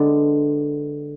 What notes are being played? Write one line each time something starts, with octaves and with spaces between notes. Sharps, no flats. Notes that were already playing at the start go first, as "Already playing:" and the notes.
Already playing: D3 G#3 B3 D4